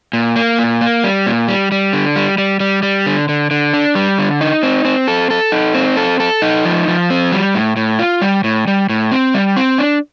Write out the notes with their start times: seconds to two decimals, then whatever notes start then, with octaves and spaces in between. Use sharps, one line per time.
0.13 A#2
0.36 A#3
0.59 A#2
0.81 A#3
1.04 G3
1.27 A#2
1.48 G3
1.72 G3
1.93 D3
2.16 G3
2.38 G3
2.60 G3
2.83 G3
3.06 D3
3.29 D3
3.51 D3
3.74 D4
3.95 G3
4.19 D3
4.41 D#4
4.63 C4
4.85 C4
5.08 A4
5.30 A4
5.52 D#4
5.74 C4
5.97 A4
6.20 A4
6.42 D#4
6.65 F3
6.88 F3
7.10 C4
7.32 G3
7.55 A2
7.76 A2
7.99 F4
8.22 G3
8.44 A2
8.67 G3
8.89 A2
9.11 C4
9.34 G3
9.57 C4
9.78 D4